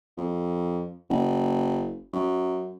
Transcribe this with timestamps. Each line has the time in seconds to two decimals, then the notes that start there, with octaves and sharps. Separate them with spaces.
0.17 F2
1.10 F#1
2.13 F#2